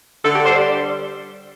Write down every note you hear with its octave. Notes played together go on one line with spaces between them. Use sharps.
D3 A4
G4
G3 C5
D5